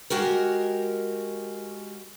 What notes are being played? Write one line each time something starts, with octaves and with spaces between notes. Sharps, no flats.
G#3 F#4 G4 A#4